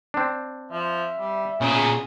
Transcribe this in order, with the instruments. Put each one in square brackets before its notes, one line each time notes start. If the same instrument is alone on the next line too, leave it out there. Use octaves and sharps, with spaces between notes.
[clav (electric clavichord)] C4 D4
[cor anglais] F3 [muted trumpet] E5
[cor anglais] G3
[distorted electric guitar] A#2 B3 [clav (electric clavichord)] C#3 [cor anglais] G#4